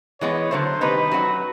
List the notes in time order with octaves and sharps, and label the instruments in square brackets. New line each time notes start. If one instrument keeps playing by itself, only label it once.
[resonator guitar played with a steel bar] E3 G#3 B3 [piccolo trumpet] C#5
[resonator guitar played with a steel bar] D3 F#3 A3 [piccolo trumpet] C5
[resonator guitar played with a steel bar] C3 D#3 G3 B3 D#4 [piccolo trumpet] B4
[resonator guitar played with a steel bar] F#3 A3 C#4 F#4